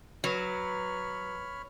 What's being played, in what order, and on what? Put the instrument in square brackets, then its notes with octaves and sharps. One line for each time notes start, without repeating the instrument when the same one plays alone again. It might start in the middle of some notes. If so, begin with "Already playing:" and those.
[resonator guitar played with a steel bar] F#3 [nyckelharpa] B4 [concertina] C#5 B5 F6